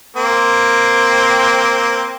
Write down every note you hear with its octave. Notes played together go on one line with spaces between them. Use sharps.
A#3 C4